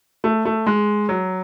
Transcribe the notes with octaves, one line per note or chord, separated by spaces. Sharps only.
A3
A3
G#3
F#3